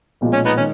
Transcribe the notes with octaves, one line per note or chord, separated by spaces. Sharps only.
B1 A#2 F3 G#3
C#4
B3 D#4
D#3 G#3 C#4